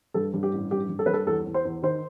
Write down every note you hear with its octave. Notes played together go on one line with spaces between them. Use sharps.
G2 A4
G2
G4
A1
G2 G4
G2
A4
G2 B4
A4
E2 A4
E2
C5
E2
D#3 C5